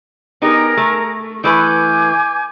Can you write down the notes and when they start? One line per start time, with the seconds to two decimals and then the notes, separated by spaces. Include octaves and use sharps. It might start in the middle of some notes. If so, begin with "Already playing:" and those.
0.42 B3 D#4 G4 G#4 A#4 A#5
0.77 A3
1.44 E3 A3 B4 G#5 D6 G6